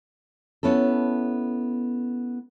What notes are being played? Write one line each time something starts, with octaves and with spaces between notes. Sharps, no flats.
B3 C#4 E4 A4